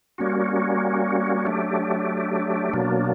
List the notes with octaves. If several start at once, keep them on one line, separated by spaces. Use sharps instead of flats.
G3 A#3 C#4 F#4
F#3 A3 D4 G4
B2 F#3 A#3 D4